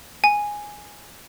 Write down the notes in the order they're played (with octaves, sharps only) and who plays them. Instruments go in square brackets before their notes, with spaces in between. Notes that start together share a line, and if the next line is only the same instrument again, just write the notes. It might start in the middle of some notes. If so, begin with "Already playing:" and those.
[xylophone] G#5